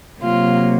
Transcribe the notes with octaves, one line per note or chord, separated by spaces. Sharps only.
C3 F#3 A#3 F4